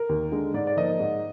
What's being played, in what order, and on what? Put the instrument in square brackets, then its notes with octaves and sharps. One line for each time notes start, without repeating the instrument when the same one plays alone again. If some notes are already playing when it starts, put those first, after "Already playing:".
Already playing: [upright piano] A#4
D#2
D3 G#3
G#2 D5
D5
F3 A#3 D#4 D#5
G#2